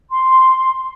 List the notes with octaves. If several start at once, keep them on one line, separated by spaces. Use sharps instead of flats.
C6